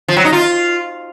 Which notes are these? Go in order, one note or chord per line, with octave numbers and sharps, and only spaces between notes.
F3
F#3
D#4
F4